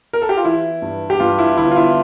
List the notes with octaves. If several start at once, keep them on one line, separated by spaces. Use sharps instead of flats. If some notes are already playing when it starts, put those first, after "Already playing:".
A#4
A4
G4
F4
E3 E4
G2
G4
G2 F4
E4
G1 E4
F4
E4